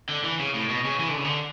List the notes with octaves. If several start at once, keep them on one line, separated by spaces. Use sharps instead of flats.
D3
E3
C#3
A2
B2
C#3
E3
D3
C#3
D3